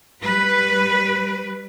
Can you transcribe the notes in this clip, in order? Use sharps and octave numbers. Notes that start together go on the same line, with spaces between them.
G3 B4